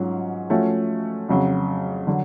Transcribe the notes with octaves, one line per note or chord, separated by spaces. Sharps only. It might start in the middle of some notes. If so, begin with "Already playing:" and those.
Already playing: G#2 F#3 C#4 F4
F3 A3 C#4 F#4
F2 C#3 F#3
D3 F#3